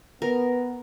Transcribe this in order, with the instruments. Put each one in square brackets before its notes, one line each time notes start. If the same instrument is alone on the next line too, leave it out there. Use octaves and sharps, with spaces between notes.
[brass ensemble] B3 [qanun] A#4